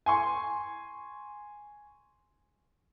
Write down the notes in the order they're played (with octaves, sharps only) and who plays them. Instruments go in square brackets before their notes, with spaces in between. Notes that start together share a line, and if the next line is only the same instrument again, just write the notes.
[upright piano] G#5 C6 C#6